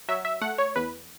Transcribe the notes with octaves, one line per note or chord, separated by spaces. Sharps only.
F#3 E5
E5
A3 F#5
C#5
E2 B4